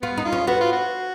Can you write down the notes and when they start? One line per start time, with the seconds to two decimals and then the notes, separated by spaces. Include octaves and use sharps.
0.02 B3 F4
0.17 D#4
0.25 F4
0.32 C#4
0.47 B3 F#4
0.61 F4
0.73 F#4